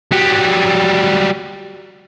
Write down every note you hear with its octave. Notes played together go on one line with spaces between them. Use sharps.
F#3 G3